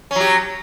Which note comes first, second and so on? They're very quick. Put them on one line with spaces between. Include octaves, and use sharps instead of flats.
C#4 F#3 G4